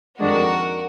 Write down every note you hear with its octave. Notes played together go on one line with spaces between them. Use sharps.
F2 D#3 G#3 D4 F#4 A#4